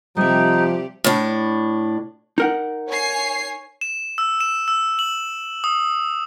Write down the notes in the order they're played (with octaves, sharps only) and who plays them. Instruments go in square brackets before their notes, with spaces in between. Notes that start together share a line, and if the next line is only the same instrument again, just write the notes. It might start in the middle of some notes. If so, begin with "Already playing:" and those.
[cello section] C3 G4 [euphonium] F3 [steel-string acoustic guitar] G3 E5 [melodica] D#4
[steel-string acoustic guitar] A2 D4
[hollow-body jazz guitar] D#4 A#4 F#5
[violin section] C#5 G#5 C7
[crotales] E7
E6
E7
E6
F#7
D#6